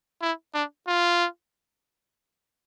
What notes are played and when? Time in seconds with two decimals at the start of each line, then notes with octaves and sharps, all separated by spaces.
0.22 E4
0.54 D4
0.87 F4